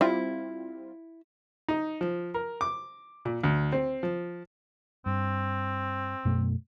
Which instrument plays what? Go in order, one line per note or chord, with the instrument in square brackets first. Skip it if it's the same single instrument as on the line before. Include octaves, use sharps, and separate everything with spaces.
[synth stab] G3 C4 F4 [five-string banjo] E4
[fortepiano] D#4
F3
A#4
D6
A#2
D2
C4
F3
[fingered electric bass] G2 [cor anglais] C4
[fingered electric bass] F#2 B2 A3